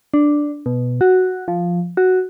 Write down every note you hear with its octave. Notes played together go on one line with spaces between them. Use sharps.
D4
B2
F#4
F3
F#4